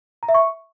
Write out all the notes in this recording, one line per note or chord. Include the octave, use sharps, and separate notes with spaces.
A#5
E5
C#6